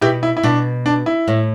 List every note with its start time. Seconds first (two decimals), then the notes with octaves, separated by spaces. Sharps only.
0.01 B2 E4 G4
0.23 E4
0.37 E4
0.43 B2 D4
0.86 D4
1.06 E4
1.28 A2